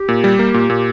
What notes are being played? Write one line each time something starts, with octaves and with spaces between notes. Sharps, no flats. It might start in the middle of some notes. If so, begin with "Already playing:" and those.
Already playing: G4
A#2
G3
A#3
A#2
A#2